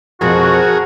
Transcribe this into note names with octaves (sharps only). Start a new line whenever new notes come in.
F2 B2 F3 F#4 G#4 A#4